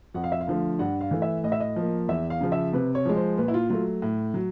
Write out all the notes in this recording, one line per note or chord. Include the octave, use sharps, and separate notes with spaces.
F2 F#5
F5
E5
F5
D3 F3 A3
G2 F#5
F5
E3 A3
E5
A2 D#5
E5
D#5
F3 A#3
E2 E5
F5
C#3 F3
E5
C3 B4
C#5
F3 G#3
C5
A#2 B4
E4
F4
F#3 A3 F4
A2
F#3